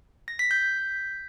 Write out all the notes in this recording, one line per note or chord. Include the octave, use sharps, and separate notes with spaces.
A#6
B6
G6